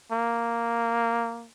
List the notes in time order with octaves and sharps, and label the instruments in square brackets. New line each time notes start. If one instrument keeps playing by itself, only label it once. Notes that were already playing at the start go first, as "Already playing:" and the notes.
[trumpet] A#3